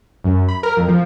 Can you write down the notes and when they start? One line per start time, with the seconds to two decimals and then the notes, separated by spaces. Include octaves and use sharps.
0.24 F#2
0.48 B5
0.63 A#4
0.77 F2
0.88 F3